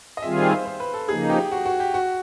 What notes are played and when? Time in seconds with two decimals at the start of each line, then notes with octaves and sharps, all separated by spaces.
0.17 D#5
0.22 D#3 G3 C4 F4 G#4 E5
0.37 F5
0.52 C5
0.66 C5
0.80 B4
0.94 A4
1.08 C#3 F3 A#3 D#4 G#4
1.30 G4
1.51 F#4
1.66 F#4
1.80 G4
1.94 F#4